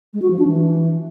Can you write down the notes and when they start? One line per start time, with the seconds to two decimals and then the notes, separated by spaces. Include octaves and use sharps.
0.14 G#3
0.22 F#4
0.31 F3
0.39 D4
0.48 E3